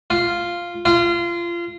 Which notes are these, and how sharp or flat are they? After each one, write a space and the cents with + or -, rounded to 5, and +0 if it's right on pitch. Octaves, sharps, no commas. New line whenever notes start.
F4 -5
F4 -25